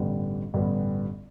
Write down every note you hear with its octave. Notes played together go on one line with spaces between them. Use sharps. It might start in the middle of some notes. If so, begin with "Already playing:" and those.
Already playing: A1 G2 D3 G3 B3
A1 G2 D3 G3 B3